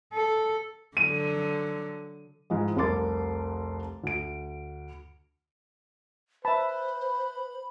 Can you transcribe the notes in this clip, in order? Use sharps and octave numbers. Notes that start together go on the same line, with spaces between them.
A4
D3 F#3 D#7
G#2 E3 F3 G#3
F1 C2 A#4 C6 D6 A6
D2 D7
B4 C5 E5 A5 B5